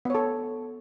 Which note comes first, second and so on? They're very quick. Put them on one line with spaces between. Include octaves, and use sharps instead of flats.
B3 C#5 A4